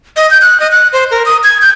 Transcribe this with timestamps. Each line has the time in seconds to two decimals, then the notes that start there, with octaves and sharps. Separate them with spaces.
0.16 D#5
0.31 G6
0.42 F#6
0.60 D#5
0.71 F#6
0.93 C5
1.11 A#4
1.26 D#6
1.44 G#6
1.62 G6